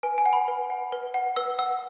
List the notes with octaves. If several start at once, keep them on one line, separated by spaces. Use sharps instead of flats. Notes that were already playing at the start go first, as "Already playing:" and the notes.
B4 G#5
G#5
F#5
B5
B4
F#5
B4
F#5
B4 E6
F#5 E6